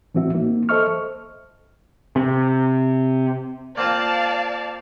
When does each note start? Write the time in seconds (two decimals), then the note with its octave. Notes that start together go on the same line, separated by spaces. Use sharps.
0.15 A2 E3 C4 F#4 E5
0.35 A#3 D#4
0.69 A4 C5 D#5 E5 C#6 F6
2.16 C3
3.77 A#3 C4 F4 D5 F5 A5